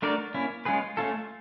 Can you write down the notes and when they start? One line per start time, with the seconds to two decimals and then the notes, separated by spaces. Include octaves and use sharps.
0.02 A3 D4 F#4 A#4 D5
0.34 A#3 C#4 E4
0.65 G#3 C#4 F4 G#4 B4
0.97 A3 C#4 F4 A4